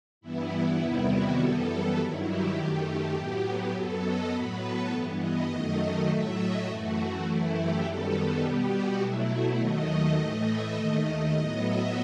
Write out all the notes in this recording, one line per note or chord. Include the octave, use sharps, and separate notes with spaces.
G2 E3 B3 E4
E2 C3 D#3 G3 B3 E4
F#4
F#2 E3 G3 B3 A4
A4
G2 D#3 F#3 E4
G4
F#2 D#3 A3
A2 F#3 B3
F#2 F#3 B3 A4
D#5
A2 F#3 B3 B4
A4
G2 E3 B3
D#5
F#2 D#3 F#3 A3 D#5
A2 F#3 A3 E5
D#5
F#2 E3 A3 F#4
F#2 E3 A3 E4
G4
F#2 D#3 G3 B3 A4
A4
B2 G3 B3 G4
F#4
B2 F#3 A3 E4
D#2 D#3 F#3 A3 D#5
A2 E3 A3 D#5
E5
D#2 D#3 A3 D#5
A2 F#3 B3 D#5
E5